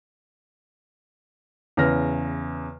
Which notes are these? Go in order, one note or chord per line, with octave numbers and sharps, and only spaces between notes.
E2 C#3 C#5 F6 A#6